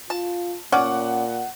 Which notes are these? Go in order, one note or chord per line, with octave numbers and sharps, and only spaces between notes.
F4 A5
A#2 C#4 D5 F#5